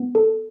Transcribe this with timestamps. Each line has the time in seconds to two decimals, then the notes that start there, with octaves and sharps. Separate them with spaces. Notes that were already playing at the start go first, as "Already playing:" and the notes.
Already playing: B3
0.15 A4